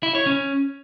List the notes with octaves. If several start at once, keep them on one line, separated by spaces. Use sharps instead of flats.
E4
C#5
C#4